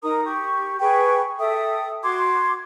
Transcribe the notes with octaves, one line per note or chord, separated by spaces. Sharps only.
D#4 A#4 A#5 D#6
G4 C#6
G#4 B4 G5 C#6
A4 E5 G5 D#6
F#4 C6 D6 G#6